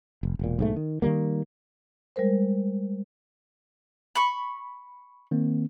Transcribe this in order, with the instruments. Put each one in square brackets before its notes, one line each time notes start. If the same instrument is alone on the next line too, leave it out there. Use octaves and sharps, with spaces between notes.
[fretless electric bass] F1
E1 A#2
B1 G#2 A3
D#3
D#3 E3 G3 A#3
[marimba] G3 G#3 A#4 C5
[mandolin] B5 C#6
[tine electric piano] D#3 A#3 C4